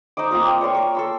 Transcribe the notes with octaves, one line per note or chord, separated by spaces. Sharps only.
D#4 C5 D#5 D6
A#3 C4 F4 A#4
G5 A#5
C#5 D5 C6 C#6
A#4 C#5
A4 C6 E6